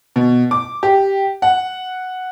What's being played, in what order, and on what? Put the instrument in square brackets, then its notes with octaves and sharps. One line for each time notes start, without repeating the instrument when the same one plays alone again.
[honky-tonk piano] B2
D6
G4
F#5